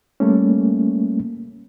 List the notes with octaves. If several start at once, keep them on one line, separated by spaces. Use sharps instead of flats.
G3 A3 A#3 C#4